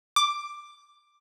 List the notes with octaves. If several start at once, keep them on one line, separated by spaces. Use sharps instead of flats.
D6